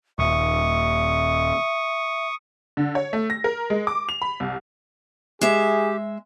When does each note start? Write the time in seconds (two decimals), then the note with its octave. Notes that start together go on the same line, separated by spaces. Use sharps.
0.19 D#1 E5 C#6 D#6
2.77 D3
2.95 C#5
3.13 A3
3.30 A#6
3.44 A#4
3.70 G#3
3.87 D6
4.09 F7
4.22 B5
4.40 C2
5.41 G#3 G4 G#4 E5